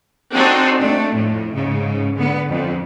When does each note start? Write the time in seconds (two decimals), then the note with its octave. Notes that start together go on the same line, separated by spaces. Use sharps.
0.32 C4 D4 D#4 F#4 G#4 A4
0.80 A3 D4
1.14 F2 A2
1.53 G#2 C#3
2.15 D3 B3
2.50 F2